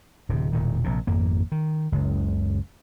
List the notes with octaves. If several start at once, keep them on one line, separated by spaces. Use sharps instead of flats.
D1 C3
E1 A#2 D#3
A#1 C3
G#1 F2 A#3
D#3
F#1 C#2